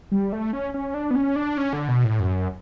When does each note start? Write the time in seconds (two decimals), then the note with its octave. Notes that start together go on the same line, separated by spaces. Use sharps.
0.12 G3
0.33 A3
0.53 C#4
0.74 C#4
0.94 D4
1.11 B3
1.16 C#4
1.36 D4
1.58 C#4
1.73 D3
1.88 B2
2.05 A2
2.20 F#2